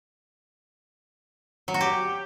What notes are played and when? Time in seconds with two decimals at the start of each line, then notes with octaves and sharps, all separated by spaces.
1.68 F#3
1.74 F#4
1.81 G4